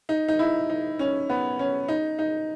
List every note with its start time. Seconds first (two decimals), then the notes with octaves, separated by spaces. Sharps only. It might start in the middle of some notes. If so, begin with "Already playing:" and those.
0.09 D#4
0.28 D#4
0.39 E4
0.70 D#4
0.99 C#4
1.30 B3
1.59 C#4
1.88 D#4
2.19 D#4